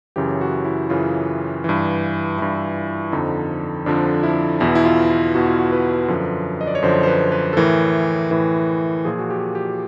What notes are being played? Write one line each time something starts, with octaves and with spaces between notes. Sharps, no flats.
F#2 C#3 E3 G4
F#4
E4
F#2 C#3 E3 F4
G2 E3
G2 E3 E4
F2 D3 F3 D#4
F2 D3 F3 D4
E4
E2 B2 E4
E4
F4
F4
E2 B2 F#4
F4
F#4
B4
F#2 D3 F3
D#5
D5
C#5
F#2 D3 F3 C5
C5
B4
B4
A4
A2 E3 A#4
A2 E3
A#2 F3 G#4
F#4
G4
G4